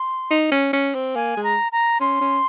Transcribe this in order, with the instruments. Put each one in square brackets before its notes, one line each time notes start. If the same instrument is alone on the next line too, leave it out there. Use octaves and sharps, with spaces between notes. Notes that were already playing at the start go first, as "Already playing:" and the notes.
Already playing: [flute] C6
[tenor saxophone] D#4
C#4
C#4
C4
[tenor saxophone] A#3 [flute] G#5
[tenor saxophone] G#3
[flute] A#5
A#5
[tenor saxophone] C#4 [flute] C6
[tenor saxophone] C#4